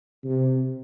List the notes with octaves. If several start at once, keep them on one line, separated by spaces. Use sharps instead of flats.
C3